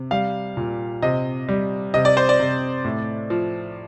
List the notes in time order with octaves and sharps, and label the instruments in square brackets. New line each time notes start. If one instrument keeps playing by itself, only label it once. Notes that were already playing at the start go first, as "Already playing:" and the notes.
Already playing: [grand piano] C3
G3 F5
A#2
C3 D#5
G3
C3 D#5
D5
C5
D5
C3
A2
F3